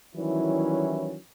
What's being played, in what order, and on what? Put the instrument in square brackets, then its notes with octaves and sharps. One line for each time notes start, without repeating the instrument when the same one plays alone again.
[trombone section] D#3 E3 F#3 G3 C#4 E4